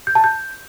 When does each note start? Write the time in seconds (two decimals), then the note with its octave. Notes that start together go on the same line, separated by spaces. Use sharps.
0.07 G6
0.15 A5
0.24 G6